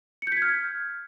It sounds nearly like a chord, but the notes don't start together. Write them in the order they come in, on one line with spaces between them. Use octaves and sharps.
C#7 G6 B6 G#6 F6